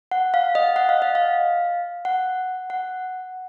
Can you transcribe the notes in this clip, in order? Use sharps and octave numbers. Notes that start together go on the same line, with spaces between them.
F#5
F5
D#5
F#5
F5
D#5
F5
F#5
F#5